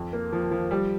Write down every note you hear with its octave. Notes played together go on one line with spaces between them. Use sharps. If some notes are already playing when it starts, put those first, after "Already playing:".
Already playing: F2
A#3
F3
F3
G3